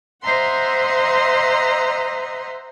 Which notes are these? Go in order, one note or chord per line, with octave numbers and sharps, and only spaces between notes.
C5 D#5 E5 F#5 A#5 C6